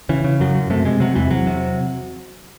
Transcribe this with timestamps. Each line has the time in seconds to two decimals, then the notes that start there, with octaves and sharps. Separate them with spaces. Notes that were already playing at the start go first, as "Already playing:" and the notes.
0.09 C#3 E3
0.24 C#3
0.40 F#2 F#3
0.55 F#2
0.70 C3 A3
0.85 C3 G#3
1.00 C3 F#3
1.15 E2 E3
1.31 E2 F#3
1.47 C3